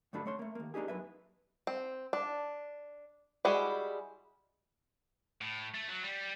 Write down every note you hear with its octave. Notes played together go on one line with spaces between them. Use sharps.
D2 G2 A3 D4 A4 B5
A3 C#5 C6
A3 A#3
D#2 A#3
A#3 D4 D#4 G4 G#4
F#2 B4 E5
C4
D4
G3 G#3 E4 F#4 G#4
A2
A3
F#3
G3